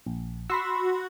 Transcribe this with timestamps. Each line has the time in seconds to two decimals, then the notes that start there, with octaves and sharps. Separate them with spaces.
0.06 A#1
0.50 F#4 B5 C6 E6